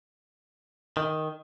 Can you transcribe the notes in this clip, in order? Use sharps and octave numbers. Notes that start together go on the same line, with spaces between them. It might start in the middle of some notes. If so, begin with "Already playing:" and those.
D#3